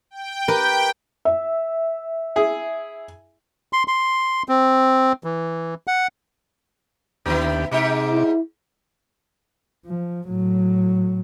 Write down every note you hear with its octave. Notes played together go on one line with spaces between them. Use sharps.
G5
G4 A#4 B4
E5
E4 G#4
C6
C6
C4
E3
F#5
D#2 D3 B3 D4 E4 G4
G#2 C3 D#4 G4 D6
E4
F3
A2 F#3